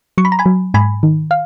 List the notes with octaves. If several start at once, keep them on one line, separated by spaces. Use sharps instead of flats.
F#3 C#6
B5
A#5
G#5 B5
F#3
G#2 G#5 B5
D#3
F5